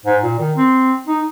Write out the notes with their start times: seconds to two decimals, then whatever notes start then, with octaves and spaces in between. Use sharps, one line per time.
0.05 G#2
0.23 A#2
0.39 D#3
0.56 C4
1.07 D#4